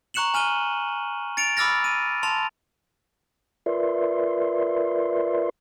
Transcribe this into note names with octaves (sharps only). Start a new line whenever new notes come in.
A#5 C#6 F#6 C#7 E7 F#7
G#5 F6 D#7 G7
A6 C#7 D7 F7
B5 D6 E6 F6 A6 A#6
D#7
A5 C6 F7
F4 A#4 B4 D5 E5 C6